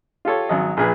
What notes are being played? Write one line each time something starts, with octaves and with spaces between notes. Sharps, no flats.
F4 G4 A4 C#5
G#1 F#3 D#5
A#1 A#2 G#4 B4